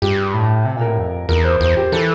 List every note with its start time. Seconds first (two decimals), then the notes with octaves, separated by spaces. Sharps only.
0.02 G2 G4
0.34 A2
0.65 C3
0.76 A#2
0.81 A#4
0.86 A2
0.98 F2
1.29 E2 A#4
1.45 C5
1.61 E2 C5
1.77 G4
1.92 E3 A4